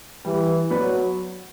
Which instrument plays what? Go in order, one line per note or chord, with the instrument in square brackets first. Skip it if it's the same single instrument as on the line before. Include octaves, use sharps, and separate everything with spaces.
[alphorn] E3 [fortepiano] G3
[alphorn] F#3 [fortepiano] B3 F#4 B4 D5